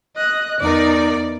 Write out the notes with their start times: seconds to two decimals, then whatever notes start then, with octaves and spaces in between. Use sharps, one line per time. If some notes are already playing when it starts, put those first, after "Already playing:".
0.16 D#5 F#6
0.61 E2 D#4 A#4 D5